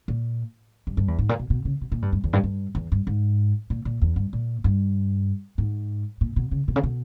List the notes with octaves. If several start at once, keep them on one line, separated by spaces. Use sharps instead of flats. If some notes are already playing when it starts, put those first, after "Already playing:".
A#2
G2
G2
E2
G#2
A#2
B2
B2
C#3
B2
A#2
G2
G2
E2
G2
G2
E2
G2
G#2
A#2
A#2
E2
G2
A#2
G2
G#2
A#2
B2
C#3
B2
C#3
B2